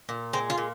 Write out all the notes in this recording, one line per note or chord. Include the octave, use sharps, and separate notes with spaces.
A#2
G#3 C4
F4
A#2